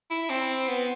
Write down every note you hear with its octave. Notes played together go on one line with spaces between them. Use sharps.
E4
C4
B3